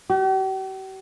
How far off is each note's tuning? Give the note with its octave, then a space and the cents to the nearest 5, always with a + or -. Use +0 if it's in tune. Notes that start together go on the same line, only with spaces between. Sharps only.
G4 -45